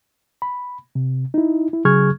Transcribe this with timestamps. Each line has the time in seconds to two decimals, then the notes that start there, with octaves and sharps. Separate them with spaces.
0.42 B5
0.95 C3
1.34 D#4 E4
1.73 E4
1.85 C#3 F#3 G#4 C#6 F6 G#6